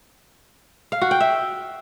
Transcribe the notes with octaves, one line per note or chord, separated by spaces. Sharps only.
F5
F#4
G5
E5